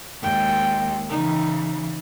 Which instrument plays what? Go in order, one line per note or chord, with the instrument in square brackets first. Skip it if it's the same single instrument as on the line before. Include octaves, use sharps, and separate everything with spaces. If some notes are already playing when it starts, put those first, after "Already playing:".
[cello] D#2 G#3 [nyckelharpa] G5
[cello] C#3 E3 [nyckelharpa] D#4